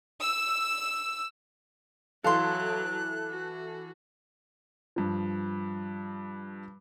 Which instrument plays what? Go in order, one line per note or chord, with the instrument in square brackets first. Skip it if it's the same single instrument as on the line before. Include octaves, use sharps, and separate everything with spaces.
[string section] E6
[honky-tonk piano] E3 A4 [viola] F#3 [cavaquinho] F5 C6 [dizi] F#6
[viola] F#4
[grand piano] G2 F3